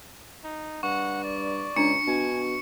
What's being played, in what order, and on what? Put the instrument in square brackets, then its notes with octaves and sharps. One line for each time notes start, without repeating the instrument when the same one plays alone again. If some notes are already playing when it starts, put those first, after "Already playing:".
[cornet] D#4
[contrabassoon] G2 [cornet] F#5 [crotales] C#6
[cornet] D5
[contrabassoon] C#2 [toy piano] D4 A#5 [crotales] C#6 C#7
[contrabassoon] B2 [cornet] G#5